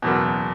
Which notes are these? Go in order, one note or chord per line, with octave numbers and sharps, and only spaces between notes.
F#1 E2 B2